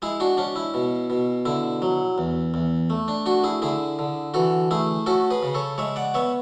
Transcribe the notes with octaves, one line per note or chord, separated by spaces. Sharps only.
G#3 E4 G#4
D4 F#4
C#4 D4
E4
B2
B2
D3 E4
F#3
E2
E2
A3
D4
D4 F#4
E4 G#4
D3 E4 G#4
D3
E3 F#4 A4
A3 E4 G#4
C#4 F#4 A4
G#4 B4
C#3
A4 C#5
G#3 C#5 E5
D5 F#5
B3 C#5 E5